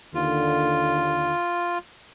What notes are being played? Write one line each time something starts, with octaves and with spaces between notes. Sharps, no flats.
D#2 D3 F4